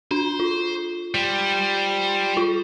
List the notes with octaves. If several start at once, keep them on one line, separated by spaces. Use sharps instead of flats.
D4 C5
F4
G3 C5
F4